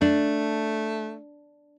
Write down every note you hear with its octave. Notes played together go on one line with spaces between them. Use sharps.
A3 D4